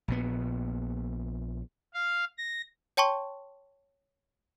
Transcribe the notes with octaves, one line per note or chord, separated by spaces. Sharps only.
A#1 A#2 B3
F5
A#6
C#5 G5 A5 C6 C#6